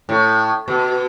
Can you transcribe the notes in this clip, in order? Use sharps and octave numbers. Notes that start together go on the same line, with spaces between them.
A2
B2